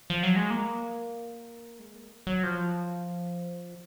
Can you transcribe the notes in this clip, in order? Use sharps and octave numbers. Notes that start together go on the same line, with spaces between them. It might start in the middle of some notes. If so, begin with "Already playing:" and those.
F3
F#3
G#3
A#3
G#3
A#3
F#3
F3